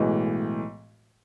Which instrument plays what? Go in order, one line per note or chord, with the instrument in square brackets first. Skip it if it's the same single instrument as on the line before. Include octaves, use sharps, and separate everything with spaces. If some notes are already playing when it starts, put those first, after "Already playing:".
Already playing: [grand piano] B1 A2 E3 G#3